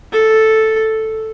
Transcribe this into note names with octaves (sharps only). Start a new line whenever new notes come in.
A4